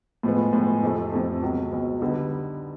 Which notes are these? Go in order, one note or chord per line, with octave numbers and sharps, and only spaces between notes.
A2 F3 G#3 B3
A2 F3 G#3 B3
F2 C3 F3 A3
F2 C3 F3 A3
C#2 B2 F#3
C#2 B2 F#3
D3 G3 B3 D#4